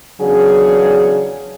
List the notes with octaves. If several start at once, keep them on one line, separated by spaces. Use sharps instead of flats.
E2 C#3 F#3 D4 G#4